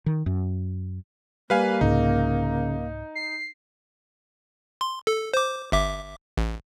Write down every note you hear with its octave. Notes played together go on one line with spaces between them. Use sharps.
D#3
F#2
G3 A#3 B4 F5 G#5
C2 G#2 C#3 D#4
C7
C6
A4
C5 D6
G1 E5 D6
A1